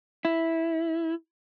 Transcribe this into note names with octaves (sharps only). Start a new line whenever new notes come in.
E4